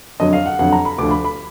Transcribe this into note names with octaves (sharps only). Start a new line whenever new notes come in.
F2 D3 F#3 D#5
F5
F#5
F2 D3 F#3 F#5
A#5
B5
D2 D3 F3 D6
B5
B5